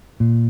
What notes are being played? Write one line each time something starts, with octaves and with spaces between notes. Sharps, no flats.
A#2